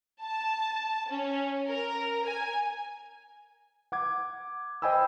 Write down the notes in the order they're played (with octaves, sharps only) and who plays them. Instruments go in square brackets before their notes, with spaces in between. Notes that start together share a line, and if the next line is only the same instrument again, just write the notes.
[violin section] A5
C#4
A#4
G#5
[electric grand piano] F#5 D6 G#6
C5 D#5 G5 G#5 B5 E6